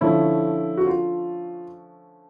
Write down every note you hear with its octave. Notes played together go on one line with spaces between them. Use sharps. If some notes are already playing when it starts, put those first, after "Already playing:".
D3 F3 A3 C#4 E4
F#4
F4